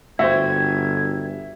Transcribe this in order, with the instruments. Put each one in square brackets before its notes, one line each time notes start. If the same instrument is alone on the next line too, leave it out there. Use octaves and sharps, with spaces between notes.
[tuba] G1 [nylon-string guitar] F#4 G4 C5 [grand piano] E5 [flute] G#6